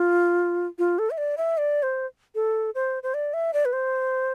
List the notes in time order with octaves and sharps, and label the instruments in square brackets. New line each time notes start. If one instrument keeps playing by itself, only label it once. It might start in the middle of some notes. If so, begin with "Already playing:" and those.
Already playing: [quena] F4
F4
A4
E5
D5
E5
D5
C5
A4
C5
C5
D5
E5
D5
B4
C5